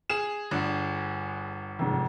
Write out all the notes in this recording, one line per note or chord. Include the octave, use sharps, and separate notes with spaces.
G#4 E7
G1 D3
F1 G#2